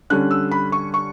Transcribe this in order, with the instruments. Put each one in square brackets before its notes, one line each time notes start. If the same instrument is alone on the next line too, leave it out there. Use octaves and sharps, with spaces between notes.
[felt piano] D3 G3 C#4 F#6
E6
B5
C#6
C#6